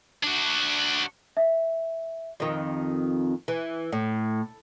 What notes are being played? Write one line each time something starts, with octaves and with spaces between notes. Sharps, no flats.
D4 F#4
E5
F2 D#3
E3
A2